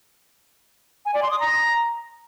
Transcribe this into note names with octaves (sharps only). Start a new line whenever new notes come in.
G#5
D5
C6
D#6
A#5